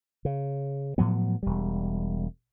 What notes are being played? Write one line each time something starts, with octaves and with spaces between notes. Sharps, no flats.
C#3
A2 F3 F#3 B3
E1 G3